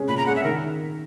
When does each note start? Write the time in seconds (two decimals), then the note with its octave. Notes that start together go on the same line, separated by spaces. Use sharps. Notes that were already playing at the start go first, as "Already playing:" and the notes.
Already playing: G#3 C#4 G#4
0.08 A#2 B5
0.17 A#5
0.26 G#3 C#4 G#4 F#5
0.36 E5
0.44 D#3 A#4